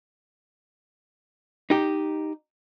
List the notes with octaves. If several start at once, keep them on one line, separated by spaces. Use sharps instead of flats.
D#4 G4